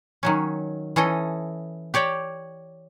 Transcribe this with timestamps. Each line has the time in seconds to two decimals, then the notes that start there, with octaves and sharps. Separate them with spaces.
0.23 D#3 F#3 C#4
0.96 E3 C#4 A4 D#5
1.94 G4 C#5 D5 G5